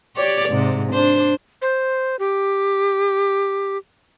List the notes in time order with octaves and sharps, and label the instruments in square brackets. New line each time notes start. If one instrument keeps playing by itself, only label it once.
[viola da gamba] G4 C#5 D5
G#2 C3
D4 C5
[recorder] C5
G4